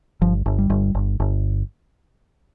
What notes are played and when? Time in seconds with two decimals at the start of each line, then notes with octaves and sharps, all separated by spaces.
0.22 G1 F3
0.46 G1
0.58 G3
0.70 G1
0.95 G1
1.20 G1